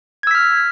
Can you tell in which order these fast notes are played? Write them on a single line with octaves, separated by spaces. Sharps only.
G#6 E6 B6 F6